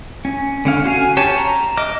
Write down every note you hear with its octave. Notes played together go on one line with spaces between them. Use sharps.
C#4
D3 C#4 F5
C#4 F#4 F5 G#5
G4 C#5 A5
A#5
D#5 D6 F6